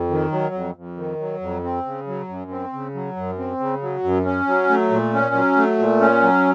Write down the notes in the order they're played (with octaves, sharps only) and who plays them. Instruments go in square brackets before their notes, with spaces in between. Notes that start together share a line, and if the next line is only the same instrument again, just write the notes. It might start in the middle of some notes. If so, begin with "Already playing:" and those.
Already playing: [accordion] F2
D#3
F#3
F2
F2
D#3
F#3
F2
C4
C#3
F#3
F#2
C4
C#3
F#3
F#2
C4
C#3
F#3
F#2
C#4
F#3
A3
A#2
C#4
F#3
A3
A#2
C#4
F#3